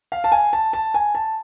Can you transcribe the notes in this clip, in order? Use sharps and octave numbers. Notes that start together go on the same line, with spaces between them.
F5
A5
G#5
A5
A5
G#5
A5